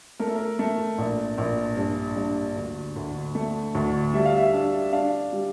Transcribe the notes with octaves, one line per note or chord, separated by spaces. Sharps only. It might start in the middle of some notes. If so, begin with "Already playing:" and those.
A3 A#4
A4
A#4
A3
A#1
A#1
G2
G2
D2
D2
A3
D2
G3 E5
F5
E5
D4
D4 F5
G3